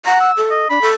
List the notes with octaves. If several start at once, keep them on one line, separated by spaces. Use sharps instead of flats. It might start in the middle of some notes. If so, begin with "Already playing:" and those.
F#5 A#5
E6
A4
D#5
D4 B5
A4